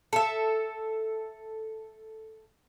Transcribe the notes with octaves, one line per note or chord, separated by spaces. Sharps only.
A4 E5